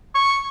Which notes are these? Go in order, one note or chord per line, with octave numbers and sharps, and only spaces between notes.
C#6